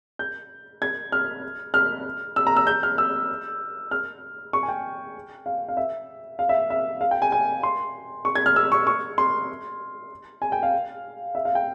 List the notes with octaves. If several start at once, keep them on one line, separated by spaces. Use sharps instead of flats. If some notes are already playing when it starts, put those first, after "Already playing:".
G6
G#6
F6
F6
E6
A#5
E6
G6
F6
E6
F6
C#6
G#5
G5
F5
F5
E5
F5
E5
E5
F5
G5
G#5
G#5
C6
C#6
G#6
F6
E6
C#6
C#6
C6
G#5
G5
F5
E5
F5
G5